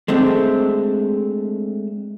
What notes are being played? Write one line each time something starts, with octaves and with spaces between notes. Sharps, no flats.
G#3 A3 C4 D4